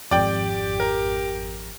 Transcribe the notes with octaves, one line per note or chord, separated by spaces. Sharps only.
G#1 F2 G4 D5 G5
A#4